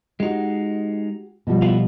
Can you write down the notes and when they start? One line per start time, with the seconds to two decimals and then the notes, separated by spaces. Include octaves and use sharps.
0.20 G#3 D#4 F#4 G4
1.47 B2 F3 G3
1.62 B3 E4 F4